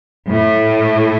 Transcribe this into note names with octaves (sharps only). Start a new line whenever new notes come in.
A2